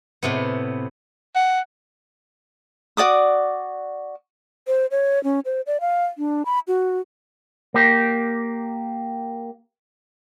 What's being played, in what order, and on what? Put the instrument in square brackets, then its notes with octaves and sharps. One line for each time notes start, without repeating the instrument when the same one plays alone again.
[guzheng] A2 C3 B3
[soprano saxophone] F#5
[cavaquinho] F#4 D5 D6 D#6
[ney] C5
C#5
C#4
C5
D5
F5
D4
B5
F#4
[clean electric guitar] A#3 G4